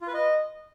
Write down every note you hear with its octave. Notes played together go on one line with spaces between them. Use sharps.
F4
B4
D#5